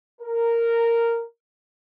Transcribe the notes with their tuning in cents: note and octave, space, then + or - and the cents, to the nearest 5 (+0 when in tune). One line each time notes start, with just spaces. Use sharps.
A#4 -10